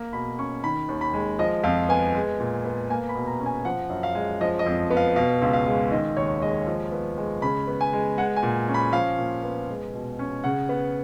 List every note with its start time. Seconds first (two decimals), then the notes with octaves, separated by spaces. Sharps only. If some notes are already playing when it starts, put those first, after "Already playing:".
Already playing: A#3
0.13 B2 B5
0.39 C#4 C#6
0.64 D#3 B5
0.88 D#2
1.01 B5
1.13 G#3
1.39 F3 D#5
1.63 F2 F5
1.89 B3 G#5
2.15 G#3
2.40 A#2
2.65 B3
2.89 A#3 G#5
3.09 B5
3.15 B2
3.27 A#5
3.40 C#4
3.46 G#5
3.65 F3 F#5
3.90 F#2
4.03 F5
4.15 G#3
4.41 F3 D#5
4.59 D#5
4.66 F2
4.90 B3
4.97 F5
5.16 B2 F5
5.42 C#2
5.53 F5
5.67 G#3
5.91 D#3 D#5
6.17 D#2 C#5
6.42 G#3 D#5
6.67 F3
6.92 B3
7.18 G#3
7.42 C#3 B5
7.67 B3
7.81 G#5
7.93 G#3
8.18 G#3 F#5
8.36 G#5
8.43 A#2
8.68 C#4
8.74 B5
8.93 F3 F5
9.18 A#2
9.43 B3
9.69 G#3
9.94 B2
10.19 C#4
10.44 C#3 F#5
10.69 B3